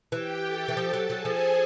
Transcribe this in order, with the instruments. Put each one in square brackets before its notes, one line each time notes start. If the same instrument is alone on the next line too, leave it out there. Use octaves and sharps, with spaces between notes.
[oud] E3 [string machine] G4 G5
[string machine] A4 A5
[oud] E3
[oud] F3 [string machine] A4 A5
[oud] F#3
[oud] F#3 [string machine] G#4 G#5
[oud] F3